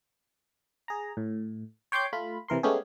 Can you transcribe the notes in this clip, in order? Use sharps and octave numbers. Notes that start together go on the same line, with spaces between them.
G#4 A#5
A2
C#5 G5 C6 D6 G6
A3 F4 B5
C3 E3 A#4 C6
G#3 A3 B3 C#4 G4 G#4